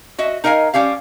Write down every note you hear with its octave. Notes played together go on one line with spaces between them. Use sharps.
F#4 D#5 E5
D#4 A#4 D#5 F5 G#5
G3 C#4 G4 F5